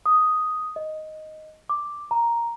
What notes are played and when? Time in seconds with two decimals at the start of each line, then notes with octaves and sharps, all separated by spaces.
0.06 D#6
0.76 D#5
1.69 D6
2.11 A#5